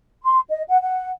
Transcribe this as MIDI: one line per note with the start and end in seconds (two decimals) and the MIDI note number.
0.24 0.40 84
0.49 0.63 75
0.68 0.78 78
0.82 1.10 78